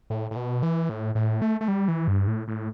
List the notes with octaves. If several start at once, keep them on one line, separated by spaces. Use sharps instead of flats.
A2
A2
B2
E3
A2
A2
A3
A3
G3
E3
G2
A2
A2